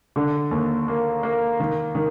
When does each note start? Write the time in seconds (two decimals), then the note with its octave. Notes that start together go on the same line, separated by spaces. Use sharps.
0.16 D3
0.51 D#2
0.88 A#3
1.23 A#3
1.60 D#3
1.95 D#3